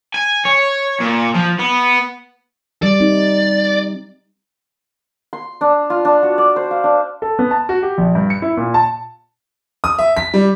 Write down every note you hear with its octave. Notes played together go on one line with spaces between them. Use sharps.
G#5
C#5
A#2
F3
B3
G3 D5
C4 D#4
C6
D4
F4
D4
F#4
D5
C5
F5
D4
A4
B3
A5
F#4
G4
A#1
G2
C#7
E4
A#2
A5
D#6
E5
B6
G3